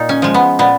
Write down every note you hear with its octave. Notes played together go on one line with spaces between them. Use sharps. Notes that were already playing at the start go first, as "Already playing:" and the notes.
Already playing: A#2 D#4
C#4
F3 G#3
B3
A#2 B3